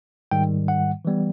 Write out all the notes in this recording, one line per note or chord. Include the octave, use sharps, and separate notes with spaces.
G#2 D#3 G3 G5
F#5
E3 G3 B3